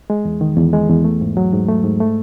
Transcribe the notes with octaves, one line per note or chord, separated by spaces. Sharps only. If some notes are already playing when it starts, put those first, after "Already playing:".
G#3
E2
D#3
E2
G#3
E2
A3
G#2
F#3
G#2
A3
G#2
A3